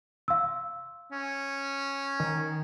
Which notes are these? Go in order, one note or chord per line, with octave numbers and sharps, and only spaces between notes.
F5 C6 E6
C#4
D#3